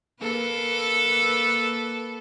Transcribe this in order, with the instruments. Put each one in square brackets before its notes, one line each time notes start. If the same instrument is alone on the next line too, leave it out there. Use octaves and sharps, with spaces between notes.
[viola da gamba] A#3 A4 B4